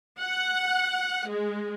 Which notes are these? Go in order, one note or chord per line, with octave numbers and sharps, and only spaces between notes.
F#5
G#3